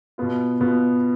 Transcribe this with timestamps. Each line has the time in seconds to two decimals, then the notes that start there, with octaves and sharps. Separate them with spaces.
0.18 B2 B3 F4
0.61 B2 B3 F4